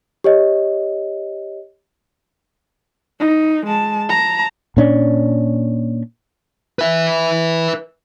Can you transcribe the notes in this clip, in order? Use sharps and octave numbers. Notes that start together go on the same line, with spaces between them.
G4 C#5 D#5
D#4
G#3 A5
A5 A#5
A#2 C#4 D4
B4 E5